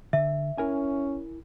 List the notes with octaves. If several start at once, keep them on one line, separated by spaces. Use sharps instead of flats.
D3 E5
C#4 E4 A#4 G#5